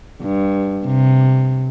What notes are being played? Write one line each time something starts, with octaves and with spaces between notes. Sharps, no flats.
G2
C3